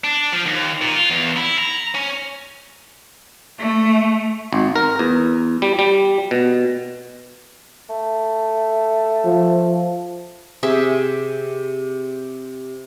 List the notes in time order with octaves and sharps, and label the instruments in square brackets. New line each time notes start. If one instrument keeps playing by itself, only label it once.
[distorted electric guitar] D4
F3
D#2
A#2
F4
E2
E4
A#5
C#4
[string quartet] A3
[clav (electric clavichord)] G#1
A#4
E2
G3
G3
B2
[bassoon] A3
[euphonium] F3
[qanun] C3 G#4 E5